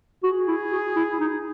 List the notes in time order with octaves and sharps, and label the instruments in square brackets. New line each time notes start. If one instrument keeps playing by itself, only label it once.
[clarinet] F#4 [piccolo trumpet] G#4
[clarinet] E4
F#4
E4
E4
D#4